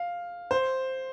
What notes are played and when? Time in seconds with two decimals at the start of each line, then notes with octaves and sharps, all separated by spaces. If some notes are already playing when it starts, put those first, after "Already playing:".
Already playing: F5
0.51 C5